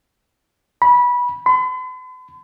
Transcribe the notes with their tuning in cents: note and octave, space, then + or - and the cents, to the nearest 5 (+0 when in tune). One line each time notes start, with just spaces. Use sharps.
B5 -20
B5 +45